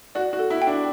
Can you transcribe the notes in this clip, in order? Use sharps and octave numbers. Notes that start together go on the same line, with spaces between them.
F#4 D5
F#4
A4
E4
G5
D4